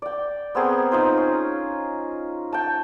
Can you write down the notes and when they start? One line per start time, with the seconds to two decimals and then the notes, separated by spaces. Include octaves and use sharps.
0.02 D5 G5
0.55 B3 C4 G#4 A#4
0.91 D#4 F4 C5
1.17 C#4
2.52 G5 A5